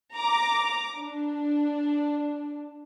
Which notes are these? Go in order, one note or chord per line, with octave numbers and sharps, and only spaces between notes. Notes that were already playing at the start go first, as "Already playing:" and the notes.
A#5 D6
D4